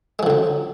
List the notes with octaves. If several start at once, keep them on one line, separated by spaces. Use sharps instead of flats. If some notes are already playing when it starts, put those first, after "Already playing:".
D3 F3 F#3 G#3